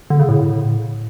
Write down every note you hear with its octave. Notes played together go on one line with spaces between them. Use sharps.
D3
C#3
A2